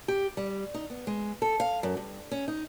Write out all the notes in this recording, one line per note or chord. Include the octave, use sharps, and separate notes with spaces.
G4
G3
D#4
B3
G#3
A4
F5
F#2
G2
C#4
D#4